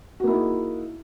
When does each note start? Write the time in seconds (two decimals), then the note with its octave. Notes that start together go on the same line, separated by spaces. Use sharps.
0.20 F#4
0.24 A#3
0.27 E4
0.31 D#4
0.35 G#4